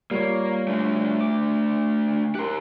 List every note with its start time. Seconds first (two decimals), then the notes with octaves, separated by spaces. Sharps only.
0.11 G3 A#3 F4 C#5
0.68 A3 D4
1.21 D6
2.35 G4 A#4 C6 F#6